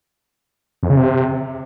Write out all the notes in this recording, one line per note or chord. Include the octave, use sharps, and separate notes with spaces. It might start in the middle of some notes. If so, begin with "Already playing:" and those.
F2
C#3
C3